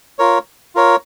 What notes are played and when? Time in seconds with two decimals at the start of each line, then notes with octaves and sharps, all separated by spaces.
0.19 F4 A#4 C#5
0.75 F4 A#4 C#5